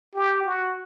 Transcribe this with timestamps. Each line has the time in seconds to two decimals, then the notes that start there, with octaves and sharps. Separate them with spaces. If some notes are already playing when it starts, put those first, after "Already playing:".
0.15 G4
0.46 F#4